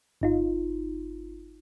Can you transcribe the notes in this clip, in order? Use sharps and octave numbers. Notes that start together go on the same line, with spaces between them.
G1 D#4 F4